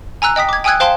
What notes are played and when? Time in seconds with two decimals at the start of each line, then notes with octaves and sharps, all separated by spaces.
0.22 G#5 A#5 E6 F#6
0.36 D#5 G5 D#6 B6
0.49 D6 G#6
0.64 G5 G#5 D#6 E6 F#6 G#6
0.80 C5 F5 G5 A5 C6